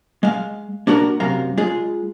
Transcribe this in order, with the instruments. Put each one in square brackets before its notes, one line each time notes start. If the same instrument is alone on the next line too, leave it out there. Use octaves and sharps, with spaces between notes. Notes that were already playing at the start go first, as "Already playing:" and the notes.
[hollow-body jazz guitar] G#3 F5
A#3 D4 F#4 A4 A#4
F#2 C3 F5 A#5
G#3 F4 G#4